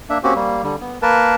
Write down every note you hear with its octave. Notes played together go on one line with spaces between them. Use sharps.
A#3 D4 E5
A#3 C4 C#4 F#4 G4
G3 A#3
D3 G3
B3
A#3 A#4 B4 A5